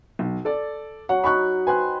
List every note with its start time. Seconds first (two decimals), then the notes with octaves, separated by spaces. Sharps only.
0.19 B1
0.45 A4 D5
1.09 F#3 F#5
1.24 D#4 B5 C#6 F#6
1.67 B4 C5 G5 G#5 F#6